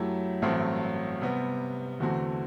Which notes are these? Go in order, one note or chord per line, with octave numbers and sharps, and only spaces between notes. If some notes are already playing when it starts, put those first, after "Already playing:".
Already playing: F#2 F#3 A3 E4 G4
A1 G2 F#3 A3 C4
C3 G3 B3
E2 D3 A3 C4 F#4